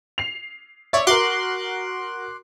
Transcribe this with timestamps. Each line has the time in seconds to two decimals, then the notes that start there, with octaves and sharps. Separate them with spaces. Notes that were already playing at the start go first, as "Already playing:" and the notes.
0.18 C7 F7
0.93 C#5 D5 E5 D6
1.07 F#4 A#4 C6 D6 F#6